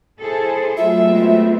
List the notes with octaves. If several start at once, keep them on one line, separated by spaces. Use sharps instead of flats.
E4 G#4 A4 C5
F#3 A3 F4 E5
G#3 B3 C4